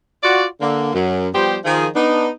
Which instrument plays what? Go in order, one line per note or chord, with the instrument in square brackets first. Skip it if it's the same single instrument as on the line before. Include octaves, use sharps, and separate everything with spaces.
[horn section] F4 F#4 D5
D3 A#3
F#2
F3 G3 B3 G4 C5
D#3 F3 G#4
B3 D4 D#4